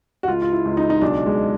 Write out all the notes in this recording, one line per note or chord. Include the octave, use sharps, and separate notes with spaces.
F#4
C#2 F4
F4
E4
C#2
D#4
D#4
B1 D4
G#3